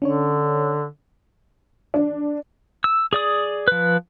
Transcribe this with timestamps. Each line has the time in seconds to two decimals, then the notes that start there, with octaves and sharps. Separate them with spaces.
0.02 D3 C#4 D4 C#5
1.94 D4
2.84 E6
3.13 G#4 D5 D#6
3.68 F3 B4